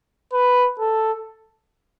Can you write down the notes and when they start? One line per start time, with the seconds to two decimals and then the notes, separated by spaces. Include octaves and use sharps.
0.33 B4
0.79 A4